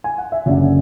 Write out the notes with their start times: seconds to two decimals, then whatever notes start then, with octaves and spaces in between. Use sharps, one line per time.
0.04 G#5
0.18 F#5
0.32 E5
0.46 F#1 F#2 D3 F#3 D5